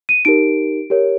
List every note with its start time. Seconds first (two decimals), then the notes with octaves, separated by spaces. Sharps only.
0.09 D#7
0.25 D#4 G4 A#4 D7
0.90 G4 A#4 C#5